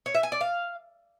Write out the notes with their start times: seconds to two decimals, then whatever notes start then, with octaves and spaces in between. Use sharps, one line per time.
0.06 C#5
0.15 E5
0.23 G#5
0.32 D5
0.41 F5